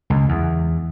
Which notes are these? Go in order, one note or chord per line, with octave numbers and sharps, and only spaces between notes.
C#2
E2